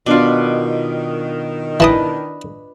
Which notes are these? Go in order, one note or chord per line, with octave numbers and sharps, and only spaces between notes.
B2 D#3 D4 F4 D5
E3 D4 B4 D#5 G5 A5 D#6